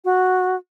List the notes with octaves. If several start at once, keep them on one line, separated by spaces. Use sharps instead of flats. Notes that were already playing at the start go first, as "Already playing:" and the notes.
F#4